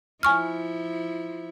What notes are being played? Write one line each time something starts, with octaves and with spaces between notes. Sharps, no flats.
F3 E4 G#5 C#6 F6